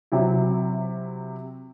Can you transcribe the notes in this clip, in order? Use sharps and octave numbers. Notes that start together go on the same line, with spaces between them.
C3 F#3 E4